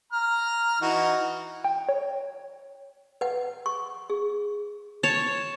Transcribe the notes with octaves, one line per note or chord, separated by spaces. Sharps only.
A#5 F6
E3 D#4 F#4
G5
C#5
B4 F#5
C#6
G#4
C#5 A5